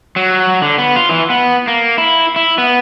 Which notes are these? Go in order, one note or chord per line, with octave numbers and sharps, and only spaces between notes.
F#3
D3
B3
F4
E3
B3
A#3
E4
E4
B3